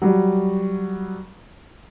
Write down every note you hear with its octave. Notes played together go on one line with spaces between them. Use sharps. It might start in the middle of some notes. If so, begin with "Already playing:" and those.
F#3 G3